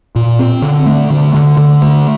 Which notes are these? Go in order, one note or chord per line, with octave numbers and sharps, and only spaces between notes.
A#2
C4
D3
A3
D3
D3
D3
A3